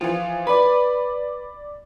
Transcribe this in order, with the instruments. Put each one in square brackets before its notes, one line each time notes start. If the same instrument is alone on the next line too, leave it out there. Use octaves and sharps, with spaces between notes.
[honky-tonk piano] E3 F3 [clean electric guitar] F4
[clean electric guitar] B4 [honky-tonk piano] D5 B5